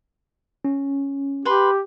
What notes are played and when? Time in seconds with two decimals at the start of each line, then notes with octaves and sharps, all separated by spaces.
0.65 C#4
1.45 G4 B4 C6